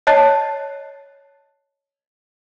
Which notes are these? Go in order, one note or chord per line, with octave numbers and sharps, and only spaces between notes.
C#5 D#5 A5 F#6 A6 C7